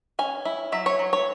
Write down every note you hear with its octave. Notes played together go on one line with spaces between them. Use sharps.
C#4 G#5
E4
F#3 E5
C#5
F#3
C#5